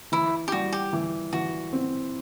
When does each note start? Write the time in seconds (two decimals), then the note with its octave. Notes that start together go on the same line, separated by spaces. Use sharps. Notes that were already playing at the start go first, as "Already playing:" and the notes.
0.12 E3 E4
0.48 G4
0.52 G3 F#4
0.72 G4
0.93 E3
1.33 E3 F#4
1.73 C4